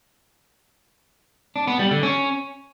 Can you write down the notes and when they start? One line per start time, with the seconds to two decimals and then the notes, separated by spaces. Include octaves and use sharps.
1.56 D4
1.67 B3
1.79 G3
1.91 D3
2.03 C#4